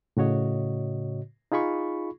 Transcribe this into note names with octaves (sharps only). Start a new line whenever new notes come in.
A2 C#3 F#4 C#5 D#5
D#4 F4 G#4 B5 C#6